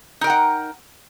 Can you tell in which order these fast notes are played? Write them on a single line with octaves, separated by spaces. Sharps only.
D#4 A#4 G5 F#5